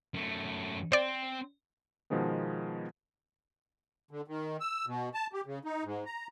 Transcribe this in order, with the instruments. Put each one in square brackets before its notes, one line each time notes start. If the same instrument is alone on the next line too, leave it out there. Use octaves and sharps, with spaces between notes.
[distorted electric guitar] F#2 A3
[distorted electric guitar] C4 [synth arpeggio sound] C5 D5
[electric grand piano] B2 D#3 F3 G#3 B3
[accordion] D3
D#3
E6
B2
A5
G4
C#3
D#4
G#2
A#5